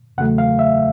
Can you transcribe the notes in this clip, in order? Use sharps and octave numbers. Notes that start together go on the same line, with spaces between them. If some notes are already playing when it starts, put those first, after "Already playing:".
E2 C#3 F#3 A3 F#5
F5
E5